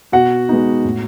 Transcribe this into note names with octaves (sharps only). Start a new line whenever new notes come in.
B2 F#4 F#5
G#3 B3 D#4
A2